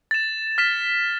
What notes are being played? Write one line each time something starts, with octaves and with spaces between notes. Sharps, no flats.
A6 E7
F6 B6 E7